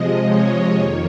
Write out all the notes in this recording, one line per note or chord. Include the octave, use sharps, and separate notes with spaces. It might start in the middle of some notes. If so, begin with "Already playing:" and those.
Already playing: C3 F3 G#3 D#5
C#5
F2 D#3 A#3